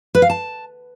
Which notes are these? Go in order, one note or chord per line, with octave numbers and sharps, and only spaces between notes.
B4
F5
A5